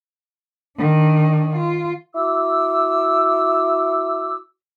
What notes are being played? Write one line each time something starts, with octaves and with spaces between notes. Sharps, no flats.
D#3 D4
F4
E4 F#4 D6 E6